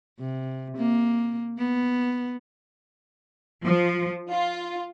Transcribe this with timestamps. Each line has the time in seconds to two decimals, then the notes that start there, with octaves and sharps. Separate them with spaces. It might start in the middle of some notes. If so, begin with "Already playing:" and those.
0.19 C3
0.77 A#3
1.58 B3
3.63 F3
4.31 F4